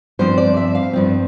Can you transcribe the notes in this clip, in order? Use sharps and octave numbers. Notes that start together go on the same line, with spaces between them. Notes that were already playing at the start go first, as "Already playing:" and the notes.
G2 F3 C4 C5
D5
E5
F5
G2 F3 C4